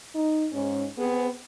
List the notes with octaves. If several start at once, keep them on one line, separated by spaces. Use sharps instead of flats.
D#4
G#2 C#4
B3 C4 G#4